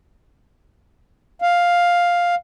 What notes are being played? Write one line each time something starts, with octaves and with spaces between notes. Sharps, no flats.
F5